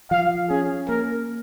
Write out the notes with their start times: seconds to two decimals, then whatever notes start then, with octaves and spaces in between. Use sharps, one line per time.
0.10 F3 F5
0.50 C#4 G#4
0.89 A#3 A#4